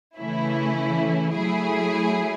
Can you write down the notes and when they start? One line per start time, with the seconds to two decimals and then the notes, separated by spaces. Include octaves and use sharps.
0.18 C#3 E3 A3 C#4 E4
1.34 F#3 A3 E4 G#4